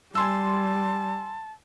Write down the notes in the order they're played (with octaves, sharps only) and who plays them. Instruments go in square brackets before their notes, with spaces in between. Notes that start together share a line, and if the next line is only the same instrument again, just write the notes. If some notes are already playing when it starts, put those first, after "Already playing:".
[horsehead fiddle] G3 [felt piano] G#5 C6 E6 [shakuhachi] A5